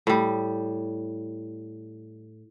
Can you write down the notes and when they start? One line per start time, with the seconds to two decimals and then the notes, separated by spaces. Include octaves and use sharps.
0.07 A2 G3